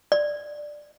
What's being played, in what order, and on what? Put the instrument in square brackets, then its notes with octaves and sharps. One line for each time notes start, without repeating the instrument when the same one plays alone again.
[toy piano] D5